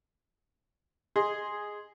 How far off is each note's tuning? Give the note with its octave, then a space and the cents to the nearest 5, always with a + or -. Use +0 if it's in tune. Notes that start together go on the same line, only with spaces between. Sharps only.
G#4 +0 D#5 +0 C6 +0